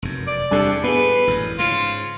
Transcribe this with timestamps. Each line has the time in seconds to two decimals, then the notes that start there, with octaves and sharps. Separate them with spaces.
0.02 F1 F#2
0.27 D5
0.51 E2 C3 G3 D4 A4
0.84 A2 B3 G#4 B4
1.27 A1 F#2
1.58 G#2 C#3 F4